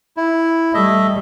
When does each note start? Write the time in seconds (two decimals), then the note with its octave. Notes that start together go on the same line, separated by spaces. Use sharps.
0.17 E4
0.74 G3 A3 D#5 E5